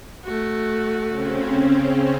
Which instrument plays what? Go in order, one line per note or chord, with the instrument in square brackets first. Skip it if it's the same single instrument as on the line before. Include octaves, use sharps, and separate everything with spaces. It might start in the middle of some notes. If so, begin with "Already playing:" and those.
[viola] A3 F#4
[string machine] C#3 C4 C#4